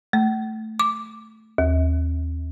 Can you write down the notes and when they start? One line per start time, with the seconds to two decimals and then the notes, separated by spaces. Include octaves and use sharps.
0.13 A3
0.79 D6
1.58 D#2